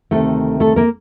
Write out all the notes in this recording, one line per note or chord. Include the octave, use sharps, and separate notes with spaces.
D2 C3 D#3 A3 A4
A3 A4
A#3 A#4